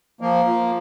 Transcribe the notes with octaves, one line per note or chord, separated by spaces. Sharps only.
F3 A#3
F3